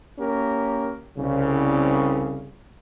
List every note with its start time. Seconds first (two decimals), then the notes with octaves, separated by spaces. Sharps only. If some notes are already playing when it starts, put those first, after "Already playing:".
0.18 A#3 C#4 G4 A#4
1.17 C2 C#3